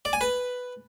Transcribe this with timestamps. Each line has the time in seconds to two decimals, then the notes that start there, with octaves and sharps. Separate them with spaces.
0.05 D5
0.13 G#5
0.21 B4